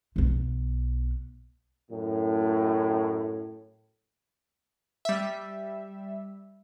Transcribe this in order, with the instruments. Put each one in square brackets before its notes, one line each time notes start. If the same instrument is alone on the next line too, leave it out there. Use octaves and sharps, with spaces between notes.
[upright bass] B1 B3
[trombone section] F#2 A2
[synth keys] G3 E5